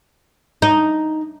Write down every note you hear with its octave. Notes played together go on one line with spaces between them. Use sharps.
D#4